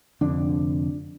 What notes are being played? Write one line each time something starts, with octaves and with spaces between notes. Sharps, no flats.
F1 F2 D3 D4